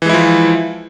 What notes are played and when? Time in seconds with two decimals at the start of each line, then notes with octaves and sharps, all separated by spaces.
0.02 E3
0.06 G#3
0.09 E4
0.13 F3